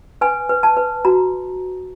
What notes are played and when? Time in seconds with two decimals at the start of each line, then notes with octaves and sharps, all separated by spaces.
0.21 B4 G#5
0.49 B4
0.63 A5
0.77 B4
1.05 F#4 A#5